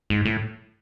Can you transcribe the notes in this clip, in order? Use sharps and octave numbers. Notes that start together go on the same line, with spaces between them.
G#2
A2